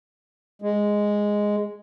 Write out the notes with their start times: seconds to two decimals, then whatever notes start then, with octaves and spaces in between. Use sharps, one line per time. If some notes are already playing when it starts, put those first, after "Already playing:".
0.62 G#3